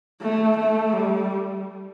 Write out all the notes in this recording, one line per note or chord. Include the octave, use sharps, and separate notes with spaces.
A3
A3
G3